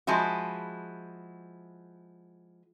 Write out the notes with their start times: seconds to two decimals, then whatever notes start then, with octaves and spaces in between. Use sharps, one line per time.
0.07 F3 G#3 E4 F#4